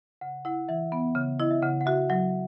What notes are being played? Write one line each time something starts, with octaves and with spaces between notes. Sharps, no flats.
C#3 F#5
E4 F#5
E3 E5
B3
C#3
E4 D#5
E5
C#3 F#5
F#5
F#4 E5
F#3 F#5